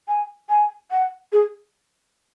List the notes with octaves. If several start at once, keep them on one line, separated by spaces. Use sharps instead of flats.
G#5
G#5
F#5
G#4